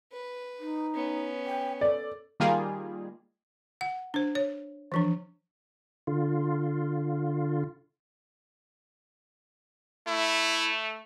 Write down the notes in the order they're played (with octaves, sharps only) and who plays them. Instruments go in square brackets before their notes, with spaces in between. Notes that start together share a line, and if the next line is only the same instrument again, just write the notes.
[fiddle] B4
[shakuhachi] D#4
[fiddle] B3 C#4
[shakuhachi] G5
[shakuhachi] A4 [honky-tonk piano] D5
[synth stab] D#3 G3 A#3 F4 G#4
[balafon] F#5
D4 C5
C#5
E3 F3 D4
[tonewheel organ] D3 F4
[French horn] A3 [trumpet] E4